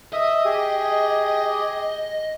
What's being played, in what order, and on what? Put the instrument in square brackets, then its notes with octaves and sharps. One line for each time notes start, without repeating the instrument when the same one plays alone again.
[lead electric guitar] D#5 [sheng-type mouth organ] E5 D#6
[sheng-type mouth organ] G4 G#4